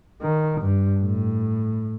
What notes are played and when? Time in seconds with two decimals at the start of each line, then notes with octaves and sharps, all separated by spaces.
0.22 D#3
0.61 G2
1.03 A2